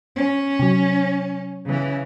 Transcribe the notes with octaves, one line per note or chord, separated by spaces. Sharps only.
C#4
C3 F#3
C#3 E3